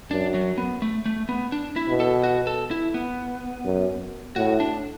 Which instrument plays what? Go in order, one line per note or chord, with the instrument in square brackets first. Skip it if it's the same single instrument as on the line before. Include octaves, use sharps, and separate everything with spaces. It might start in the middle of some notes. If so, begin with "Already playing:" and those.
[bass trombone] F#2 [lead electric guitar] D4
[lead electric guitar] F#3
B3
A3
A3
B3
D4
E4
[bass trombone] B2
[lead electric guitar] A4
F#4
A4
E4
B3
[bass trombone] F#2
[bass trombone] A2 [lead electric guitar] F#4
[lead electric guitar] D4